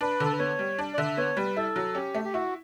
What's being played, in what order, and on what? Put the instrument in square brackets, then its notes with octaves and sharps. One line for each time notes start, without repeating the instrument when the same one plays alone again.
[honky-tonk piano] D4 [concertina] B4
[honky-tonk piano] D3 [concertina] A4
[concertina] B4
[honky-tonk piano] B3 [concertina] C#5
[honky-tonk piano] G3
D4
[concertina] D5
[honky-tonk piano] D3 [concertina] E5
[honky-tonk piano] B3 [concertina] C#5
[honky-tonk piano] G3 [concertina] B4
[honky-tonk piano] E4 [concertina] A4
[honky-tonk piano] F#3
[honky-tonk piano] C#4 [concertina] G4
[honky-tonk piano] A3
[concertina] G4
[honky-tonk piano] E4 [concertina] F#4